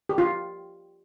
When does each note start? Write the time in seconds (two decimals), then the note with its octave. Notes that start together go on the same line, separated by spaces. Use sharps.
0.09 G4
0.18 F4